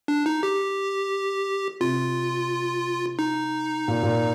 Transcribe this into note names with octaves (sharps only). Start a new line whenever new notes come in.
D4
D#4
G4
C3 F4
D#4
A#2
A#2